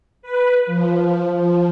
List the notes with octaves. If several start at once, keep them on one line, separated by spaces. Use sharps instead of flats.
B4
F3
F3